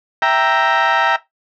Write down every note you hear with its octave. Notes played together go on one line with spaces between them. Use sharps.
E5 G5 A#5